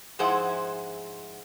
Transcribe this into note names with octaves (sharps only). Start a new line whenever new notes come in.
G#2 F3 E4 G#4 C5 F#5